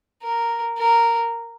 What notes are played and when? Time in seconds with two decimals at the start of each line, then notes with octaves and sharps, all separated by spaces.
0.23 A#4
0.78 A#4